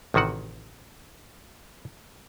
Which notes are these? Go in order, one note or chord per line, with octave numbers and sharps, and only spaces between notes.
A1 C3 D#3 F#4 F#5